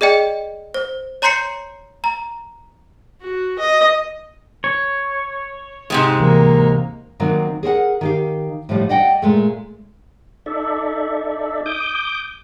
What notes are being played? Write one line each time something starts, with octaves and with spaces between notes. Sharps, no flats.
G#4 D5 D#5 G5
C5
C#5 A#5 C6 G6 C7 C#7
A#5
F#4
D#5
C#5
G#2 C3 G#3
D1 C2 E3 A#3
D#3 F#3 A#3 C4 D4
G#4 A#4 C5 F#5
D#3 G4 F5
A2 D3 F3 G3
D5 D#5 F#5 G5
A#2 G#3 A3
D#4 A4 D5 E5
D6 D#6 G6